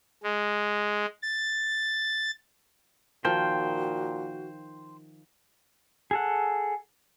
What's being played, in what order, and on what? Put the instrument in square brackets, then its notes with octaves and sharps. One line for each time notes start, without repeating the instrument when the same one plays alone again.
[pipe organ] G#3
A6
[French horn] A#2 [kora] D#3 F3 [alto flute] F#4 [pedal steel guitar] C5 G5
[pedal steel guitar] G#4 A4 F#5